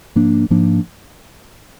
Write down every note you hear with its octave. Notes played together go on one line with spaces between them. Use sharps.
G#2 F3 A#3 D4
G#2 F3 A#3 D4